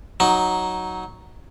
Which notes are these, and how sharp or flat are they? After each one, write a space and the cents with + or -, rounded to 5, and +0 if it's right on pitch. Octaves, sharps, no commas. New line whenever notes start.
F#3 +0 D#4 +0